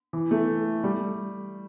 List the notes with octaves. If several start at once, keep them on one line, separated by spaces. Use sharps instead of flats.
E3
A3
G3